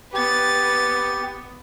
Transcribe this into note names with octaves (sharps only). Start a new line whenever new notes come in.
B3 G4 B4 A6